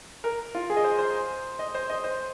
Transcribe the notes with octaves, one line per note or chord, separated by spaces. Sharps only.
A#4
F4
G#4
D#5
C5
C5
D#5
C5
D#5
C5